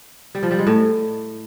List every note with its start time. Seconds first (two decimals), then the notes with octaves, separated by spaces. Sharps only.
0.35 G3
0.43 F3
0.51 G3
0.59 G#3
0.67 A2